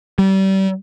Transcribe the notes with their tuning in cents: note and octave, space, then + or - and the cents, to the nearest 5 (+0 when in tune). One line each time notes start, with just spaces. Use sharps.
G3 -30